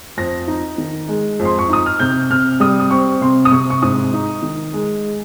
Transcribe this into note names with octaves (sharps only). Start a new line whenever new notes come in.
F2 A#6
D#4
D#3
G#3
F2
C6
C#6
D#4 D#6
F6
C3 G6
C3 F6
G3 D#6
D#6
C4 C#6
C3 C6
D#6
C3 C#6
C#6
G#2 D#6
D#4
D#3
G#3